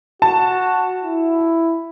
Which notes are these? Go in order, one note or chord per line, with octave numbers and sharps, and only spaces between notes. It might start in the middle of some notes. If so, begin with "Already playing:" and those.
F#4 A5
E4